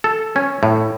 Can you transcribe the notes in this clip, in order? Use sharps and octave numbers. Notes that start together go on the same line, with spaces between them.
A4
C#4
A2